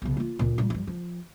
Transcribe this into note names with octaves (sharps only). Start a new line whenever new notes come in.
B1 C3
A#3 F4
D2 A#2
A#2 G3
G2 F3
F3